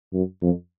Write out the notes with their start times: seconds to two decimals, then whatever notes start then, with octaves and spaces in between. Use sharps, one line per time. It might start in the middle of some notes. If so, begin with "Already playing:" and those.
0.13 F#2
0.42 F2